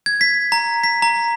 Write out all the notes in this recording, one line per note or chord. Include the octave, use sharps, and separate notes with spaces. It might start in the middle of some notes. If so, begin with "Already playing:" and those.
G#6
B6
A#5
B6
A#5